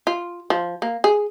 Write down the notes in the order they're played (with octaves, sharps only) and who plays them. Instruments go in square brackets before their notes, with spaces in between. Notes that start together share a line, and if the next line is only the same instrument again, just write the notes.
[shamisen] F4
F3
A#3
G#4